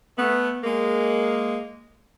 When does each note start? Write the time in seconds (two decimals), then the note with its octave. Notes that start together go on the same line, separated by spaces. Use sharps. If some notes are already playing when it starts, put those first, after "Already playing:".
0.18 A3 B3
0.63 G#3 A#3